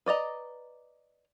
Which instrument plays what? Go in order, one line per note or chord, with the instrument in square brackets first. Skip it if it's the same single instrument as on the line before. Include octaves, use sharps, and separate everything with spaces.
[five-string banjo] B4 D5 D#5 A#5